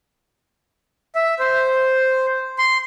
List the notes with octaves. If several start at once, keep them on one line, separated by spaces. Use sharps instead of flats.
E5
C5
C6